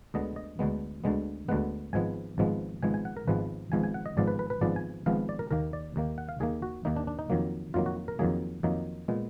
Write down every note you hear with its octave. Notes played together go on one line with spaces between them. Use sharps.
D2 D3 G#3 B3 D#5
D#5
D2 D3 G#3 B3
D2 D3 G#3 B3
D2 D3 G#3 B3 F#5
G#1 G#2 F3 G#3 B3 G#5
G#1 G#2 F3 G#3 B3
G#1 G#2 F3 G#3 B3 G#5
G#5
F#5
A#4
G#1 G#2 F3 G#3 B3 B4
G#1 G#2 F3 B3 G#5
G#5
F#5
D#5
G#1 G#2 F3 B3 D5
B4
B4
B4
G#1 G#2 F3 B3 D5
G#5
G#1 G#2 F3 B3 F5
D5
A#4
D#2 D#3 A#3 A#4
D5
D#2 D#3 A#3
F#5
F5
D#2 D#3 A#3 G#4
F#4
D#2 D#3 A#3 D#4
D4
D4
D#4
F2 D#3 F#3 A#3
F2 D#3 F#3 A#3 F4
F#4
A#4
F2 D#3 F#3 A#3 G#4
F2 D#3 F#3 A#3 D#4
A#2 G#3 B3